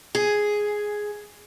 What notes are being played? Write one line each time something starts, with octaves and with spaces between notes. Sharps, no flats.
G#4